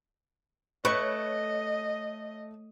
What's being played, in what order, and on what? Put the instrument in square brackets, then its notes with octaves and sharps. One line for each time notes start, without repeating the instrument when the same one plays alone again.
[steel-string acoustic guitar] A3 [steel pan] B4 B5 C#6 [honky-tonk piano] C#5 F#6 [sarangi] D#5